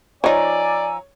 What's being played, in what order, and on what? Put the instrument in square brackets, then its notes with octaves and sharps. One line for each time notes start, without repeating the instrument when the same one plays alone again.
[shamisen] F3 D#4 [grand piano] C#5 [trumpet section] D5 [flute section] G#5 A#5 E6